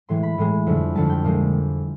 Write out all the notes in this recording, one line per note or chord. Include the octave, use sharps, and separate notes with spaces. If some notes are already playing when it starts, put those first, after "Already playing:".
A2 E3 G#3 C6
B5
A2 E3 G#3
F2 D3 G3
F2 D3 G3 A5
G5
A#2 F3 G#3